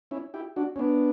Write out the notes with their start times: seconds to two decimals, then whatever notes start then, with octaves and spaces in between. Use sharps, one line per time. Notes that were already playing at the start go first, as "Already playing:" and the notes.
0.11 C#4 E4
0.34 E4 G4
0.56 D4 F#4
0.76 C#4
0.79 B3 D4